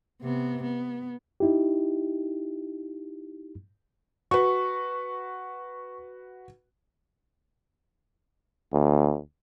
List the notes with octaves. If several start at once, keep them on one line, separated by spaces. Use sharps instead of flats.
C3 B3
B3
D#4 E4 G4
F#4 B4 C#6
D2